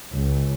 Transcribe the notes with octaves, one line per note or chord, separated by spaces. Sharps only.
C#2